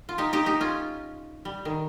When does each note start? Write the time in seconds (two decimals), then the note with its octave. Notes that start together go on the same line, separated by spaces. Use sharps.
0.09 F4
0.18 D#4 G4
0.33 D#4 G4
0.46 D#4 G4
0.60 C#4 F4
1.45 G3
1.65 D#3